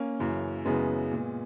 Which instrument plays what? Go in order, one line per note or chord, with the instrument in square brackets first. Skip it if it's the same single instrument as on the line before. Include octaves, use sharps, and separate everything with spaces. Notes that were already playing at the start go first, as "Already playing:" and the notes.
Already playing: [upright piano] A#3 C#4
F#2 C#3 E3
F#2 C#3 E3 G#3 B3
A#2